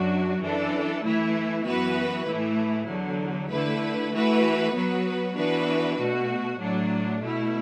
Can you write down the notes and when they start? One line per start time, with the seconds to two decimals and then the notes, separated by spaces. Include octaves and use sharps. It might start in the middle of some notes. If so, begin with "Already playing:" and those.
Already playing: F#2 F#3 D4 F#4
0.41 F#2 E3 D4 A4
1.03 E3 A3 E4
1.65 F#2 E3 B3 F#4 B4
2.27 A2 E3 A3 E4
2.88 E2 D3 F#3
3.50 D3 A3 E4 B4
4.12 E3 A3 F#4 B4
4.74 F#3 B3 F#4 B4
5.36 E3 B3 D4 F#4 B4
5.97 B2 A3 F#4
6.59 A2 F#3 D4
7.21 B2 A3 E4